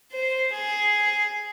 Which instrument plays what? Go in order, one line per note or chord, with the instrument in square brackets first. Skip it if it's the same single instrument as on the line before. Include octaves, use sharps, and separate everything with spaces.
[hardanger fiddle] C5
G#4